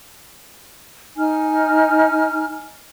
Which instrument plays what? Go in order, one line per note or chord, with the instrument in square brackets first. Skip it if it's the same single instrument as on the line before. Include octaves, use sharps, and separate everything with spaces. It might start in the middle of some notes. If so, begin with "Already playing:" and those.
[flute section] D#4 G#5 F6